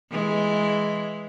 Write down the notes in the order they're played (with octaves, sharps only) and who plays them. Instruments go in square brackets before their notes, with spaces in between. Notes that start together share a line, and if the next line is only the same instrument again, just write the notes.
[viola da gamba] E3 G#3